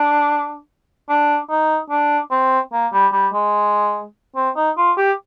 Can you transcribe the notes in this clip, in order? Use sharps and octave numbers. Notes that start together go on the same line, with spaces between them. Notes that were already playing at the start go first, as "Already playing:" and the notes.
Already playing: D4
D4
D#4
D4
C4
A#3
G3
G3
G#3
C4
D#4
F4
G4